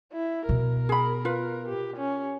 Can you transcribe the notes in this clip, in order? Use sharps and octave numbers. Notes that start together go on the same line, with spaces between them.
E4
B2 A#4
G#4 B5
F4 B4
G4
C#4